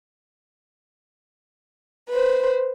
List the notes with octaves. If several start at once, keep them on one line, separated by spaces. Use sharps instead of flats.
B4 C5